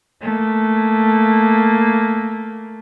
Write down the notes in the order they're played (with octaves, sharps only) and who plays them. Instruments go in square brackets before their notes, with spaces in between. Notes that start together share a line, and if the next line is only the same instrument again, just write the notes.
[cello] A3 A#3